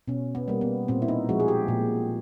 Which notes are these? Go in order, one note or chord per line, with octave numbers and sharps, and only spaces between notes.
B2 C#4
B3
G3 A#3
B3
A#2 C4
E4
D#4
F3 G#3 F#4
G#4
G4
A#2